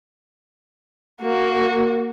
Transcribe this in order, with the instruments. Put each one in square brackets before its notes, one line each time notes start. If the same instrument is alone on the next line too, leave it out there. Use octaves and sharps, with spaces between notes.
[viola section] A#3 [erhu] F#4